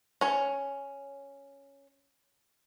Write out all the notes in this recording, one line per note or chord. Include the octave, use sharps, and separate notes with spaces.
C#4 C#5